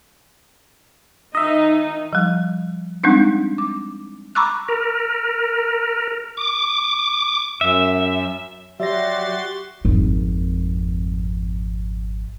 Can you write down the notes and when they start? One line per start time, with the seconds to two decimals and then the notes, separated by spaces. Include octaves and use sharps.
1.35 D#3 D#4 D#5 E5
2.13 F3 G3
3.04 G3 G#3 C4 D4 D#4
3.58 D6
4.35 A#5 B5 C#6 D6 E6 F#6
4.68 A#4
6.37 D6
7.61 F#2 E5
8.80 F#3 F#4 G4 D5 E5 C6 A6 A#6
9.85 G#1 F2